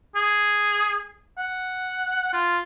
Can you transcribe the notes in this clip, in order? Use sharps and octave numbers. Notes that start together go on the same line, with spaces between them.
G#4
F#5
F4